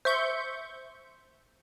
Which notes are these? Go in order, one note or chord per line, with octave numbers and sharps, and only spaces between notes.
C5 E5 C#6 G6